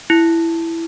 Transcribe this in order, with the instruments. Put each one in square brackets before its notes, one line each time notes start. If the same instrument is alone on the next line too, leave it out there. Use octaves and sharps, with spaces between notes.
[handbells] E4